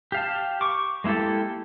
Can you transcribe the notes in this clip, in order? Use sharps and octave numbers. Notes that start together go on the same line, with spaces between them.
G4 F5 A5
C#6 D6
G#3 A#3 E4 G4 A4